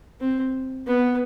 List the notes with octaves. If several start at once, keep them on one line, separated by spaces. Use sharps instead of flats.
C4
B3